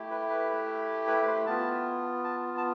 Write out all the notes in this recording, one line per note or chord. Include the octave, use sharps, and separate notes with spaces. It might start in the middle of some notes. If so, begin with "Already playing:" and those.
Already playing: A3 E4 G4
B4
B4
B4
B4
C5
B3 F4 A5
A5
A5